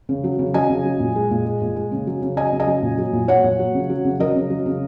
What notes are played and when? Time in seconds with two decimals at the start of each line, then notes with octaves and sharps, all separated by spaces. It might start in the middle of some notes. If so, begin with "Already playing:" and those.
0.09 C#3
0.24 F#3
0.39 C#3
0.54 F#3 D#5 G#5
0.70 C#3
0.85 F#3
1.00 A#2
1.16 G#3
1.31 A#2
1.46 G#3
1.61 A#2
1.76 G#3
1.92 C#3
2.07 F#3
2.22 C#3
2.37 F#3 D#5 G#5
2.52 C#3
2.60 D#5 G#5
2.67 F#3
2.82 A#2
2.98 F#3
3.13 A#2
3.28 F#3 C#5 F#5
3.44 A#2
3.59 F#3
3.74 C#3
3.90 F#3
4.05 C#3
4.20 F#3 A#4 D#5
4.35 C#3
4.50 F#3
4.66 C#3